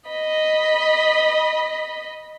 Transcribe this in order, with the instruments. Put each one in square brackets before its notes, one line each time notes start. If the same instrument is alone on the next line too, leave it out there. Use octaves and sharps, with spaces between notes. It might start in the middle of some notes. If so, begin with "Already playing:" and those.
[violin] D#5 B5